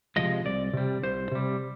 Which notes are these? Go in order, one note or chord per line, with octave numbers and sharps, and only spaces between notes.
C3 F3 G#3 D#5
C2 D5
C3 G3
C2 C5
C3 G3